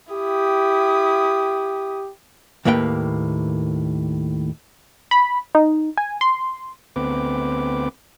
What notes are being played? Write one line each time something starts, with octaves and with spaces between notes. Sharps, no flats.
E4 G4 D#6
D#2 A2 A#3 B4 E5 G5
B5
D#4
G#5
C6
D2 B3 C4 B4 D6